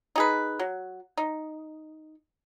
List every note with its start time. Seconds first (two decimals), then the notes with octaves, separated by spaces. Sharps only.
0.16 D#4 G#4 B4
0.59 F#3
1.18 D#4